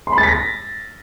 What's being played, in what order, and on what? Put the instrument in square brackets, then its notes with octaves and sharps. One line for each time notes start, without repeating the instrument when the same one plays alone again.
[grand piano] C6
B5
A6
B6
A#6